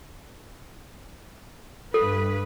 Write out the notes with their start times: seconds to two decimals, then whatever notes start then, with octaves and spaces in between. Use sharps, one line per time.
1.94 G2 A4 B4